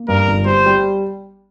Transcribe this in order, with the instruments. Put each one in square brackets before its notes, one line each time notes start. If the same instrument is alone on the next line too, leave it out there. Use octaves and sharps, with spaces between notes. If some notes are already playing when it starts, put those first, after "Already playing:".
Already playing: [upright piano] A#3
[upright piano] G2 [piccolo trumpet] A#4
[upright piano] G1
[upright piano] G3 [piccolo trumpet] C5
[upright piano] G3